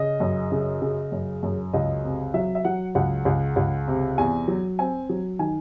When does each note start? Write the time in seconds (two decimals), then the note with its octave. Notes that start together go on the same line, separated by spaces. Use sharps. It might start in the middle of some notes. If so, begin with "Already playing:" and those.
Already playing: C#3 D#5
0.20 F#2
0.52 C#3
0.82 C#3
1.12 F#2
1.43 F#2
1.73 C#2 D#5
2.04 C3
2.34 F#3 E5
2.55 E5
2.64 F#3 F#5
2.95 C#2 F#5
3.25 C#2
3.56 C#2
3.88 C3
4.18 E2 G#5
4.48 F#3
4.79 C4 G#5
5.09 F#3
5.39 D#3 G#5